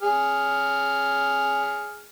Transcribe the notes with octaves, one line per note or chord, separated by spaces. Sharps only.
G#4 F6